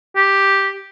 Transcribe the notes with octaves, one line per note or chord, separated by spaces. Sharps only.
G4